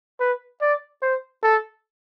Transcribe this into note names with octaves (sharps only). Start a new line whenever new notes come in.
B4
D5
C5
A4